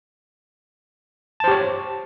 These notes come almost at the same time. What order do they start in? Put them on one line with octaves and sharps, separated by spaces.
A5 C5 G4 C#5